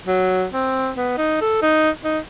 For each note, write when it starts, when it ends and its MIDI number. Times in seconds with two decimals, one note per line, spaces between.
0.07 0.45 54
0.53 0.90 60
0.97 1.17 59
1.17 1.38 63
1.41 1.59 69
1.62 1.90 63
2.04 2.19 63